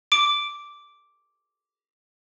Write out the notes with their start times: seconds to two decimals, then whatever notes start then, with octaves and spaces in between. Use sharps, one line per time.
0.12 D6 D7